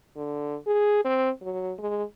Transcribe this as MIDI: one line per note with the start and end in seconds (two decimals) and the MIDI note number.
0.16 0.56 50
0.67 1.03 68
1.05 1.30 60
1.41 1.72 54
1.78 2.03 56